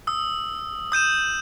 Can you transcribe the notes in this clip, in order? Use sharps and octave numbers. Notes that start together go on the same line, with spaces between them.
D#6 E6
D#6 G6 D#7 E7